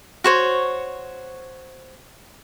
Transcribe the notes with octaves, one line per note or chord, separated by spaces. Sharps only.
F#4 C5 C#5